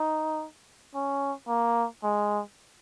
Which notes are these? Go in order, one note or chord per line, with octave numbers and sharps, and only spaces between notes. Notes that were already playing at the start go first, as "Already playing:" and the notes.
Already playing: D#4
C#4
A#3
G#3